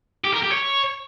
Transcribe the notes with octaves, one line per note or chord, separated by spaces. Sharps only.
G4
A#4
G4
C#5